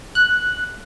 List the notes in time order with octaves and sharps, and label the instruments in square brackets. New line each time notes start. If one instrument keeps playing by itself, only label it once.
[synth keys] F#6